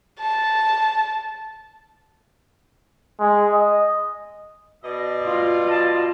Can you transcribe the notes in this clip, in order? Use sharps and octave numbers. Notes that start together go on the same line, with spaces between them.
A5
G#3
D#5
B2 D5 D#5
F4
A5